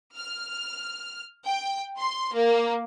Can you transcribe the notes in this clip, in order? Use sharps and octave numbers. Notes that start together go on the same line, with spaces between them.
F6
G5
C6
A#3